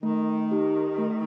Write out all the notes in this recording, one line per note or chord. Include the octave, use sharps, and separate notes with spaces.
D#3 A3
D#4 G4
A3